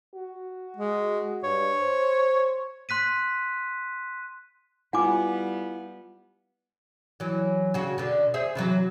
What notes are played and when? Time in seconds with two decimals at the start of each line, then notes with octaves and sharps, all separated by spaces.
0.15 F#4
0.77 G#3
1.44 G2 C#5
1.80 C5
2.89 C6 F#6 B6 D#7
4.93 G3 B3 E4 F4 F#5 G#5 D6
7.20 E3 F#3
7.74 C#3 F#4
7.98 B2 D3
8.34 G#4 C5 E5
8.55 C3 E3 F#3